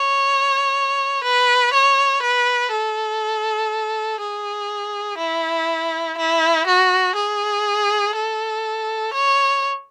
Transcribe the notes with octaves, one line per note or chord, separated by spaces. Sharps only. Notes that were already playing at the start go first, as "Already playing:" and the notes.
Already playing: C#5
B4
C#5
B4
A4
G#4
E4
E4
F#4
G#4
A4
C#5